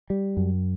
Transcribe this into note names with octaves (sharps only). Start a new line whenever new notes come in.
G3
F#2